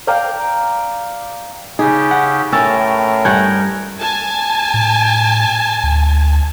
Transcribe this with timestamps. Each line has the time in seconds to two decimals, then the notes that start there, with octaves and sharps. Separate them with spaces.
0.07 D5 F5 G5 A#5
1.79 C#3 D#4 G4 G#4
2.11 F#5
2.52 A2 C#4 A#4 G5 E6 A6
3.25 G2 F#5 G#5 G6 G#6
4.00 G#5 A5
4.74 A2
5.84 D2